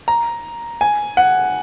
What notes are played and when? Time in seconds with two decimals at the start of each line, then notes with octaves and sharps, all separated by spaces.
0.08 A#5
0.81 G#5
1.17 F#5